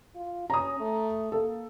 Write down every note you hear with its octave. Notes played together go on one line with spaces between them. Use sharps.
F4
C#4 A#5 D#6
A3
A#3 A4